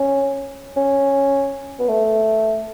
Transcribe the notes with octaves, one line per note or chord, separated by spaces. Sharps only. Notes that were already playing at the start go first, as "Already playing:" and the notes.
Already playing: C#4
C#4
B3
A3